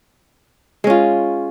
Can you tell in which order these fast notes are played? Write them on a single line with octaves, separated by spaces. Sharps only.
G#3 C#4 F4